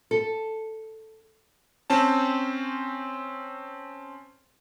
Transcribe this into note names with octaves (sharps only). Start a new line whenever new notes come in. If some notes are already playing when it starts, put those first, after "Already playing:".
A4
C4 C#4 A5